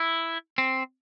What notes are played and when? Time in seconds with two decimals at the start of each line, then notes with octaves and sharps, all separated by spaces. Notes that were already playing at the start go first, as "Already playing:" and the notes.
Already playing: E4
0.58 C4